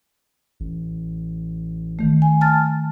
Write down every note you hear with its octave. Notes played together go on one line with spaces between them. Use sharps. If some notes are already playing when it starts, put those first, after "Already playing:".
A1
D#3 A3
G#5
A5 F6 A6